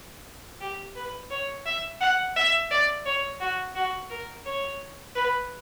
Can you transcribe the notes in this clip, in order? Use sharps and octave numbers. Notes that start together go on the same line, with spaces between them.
G4
B4
C#5
E5
F#5
E5
D5
C#5
F#4
F#4
A#4
C#5
B4